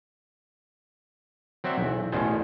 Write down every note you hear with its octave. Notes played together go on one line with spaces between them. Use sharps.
F#3 C4 D5 E5 F#5
B1 E2
A1 E2 B2 C#4 C5 A5